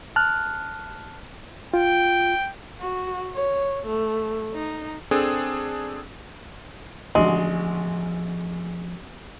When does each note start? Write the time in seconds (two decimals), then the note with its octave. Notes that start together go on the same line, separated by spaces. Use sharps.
0.16 A5 F6 F#6
1.74 F4 G5
2.80 F#4
3.33 C#5
3.86 A3
4.54 D#4
5.11 C4 D4 G#4 A4
7.15 A1 D3 F3 G#3 B3 F#4